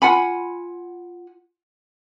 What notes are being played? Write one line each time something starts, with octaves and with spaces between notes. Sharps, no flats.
F4 F#5 G#5 B5